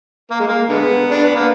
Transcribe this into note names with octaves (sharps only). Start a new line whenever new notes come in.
A#3
G#3
A#3
D3 G#3 B3
D4
B3
A#3